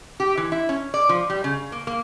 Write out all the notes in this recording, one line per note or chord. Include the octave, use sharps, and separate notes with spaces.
G4
E3
E4
C#4
D5
F3
G3
C#3
A#3
A#3